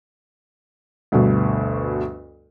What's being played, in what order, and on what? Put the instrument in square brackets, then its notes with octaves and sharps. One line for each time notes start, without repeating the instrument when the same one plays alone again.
[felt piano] D2 G2 B2